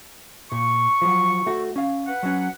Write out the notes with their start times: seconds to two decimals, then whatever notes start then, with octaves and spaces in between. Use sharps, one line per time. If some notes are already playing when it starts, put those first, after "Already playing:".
0.52 A#2 C#6
1.02 F3 F#3
1.46 A3 F#4
1.76 C#4 F5
2.07 B4 F#5
2.23 F#3 C#4